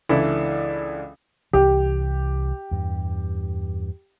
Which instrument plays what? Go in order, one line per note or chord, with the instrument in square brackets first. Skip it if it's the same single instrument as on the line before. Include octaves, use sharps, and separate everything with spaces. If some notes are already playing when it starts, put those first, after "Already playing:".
[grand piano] C#2 E3 D4 E4 A4 D5
[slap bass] C2 E3 [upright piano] G4
[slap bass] E2 G2